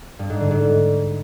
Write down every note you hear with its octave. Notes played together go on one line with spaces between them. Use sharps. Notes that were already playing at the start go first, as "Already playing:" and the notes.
G2
G#2
D3
G#2
G#2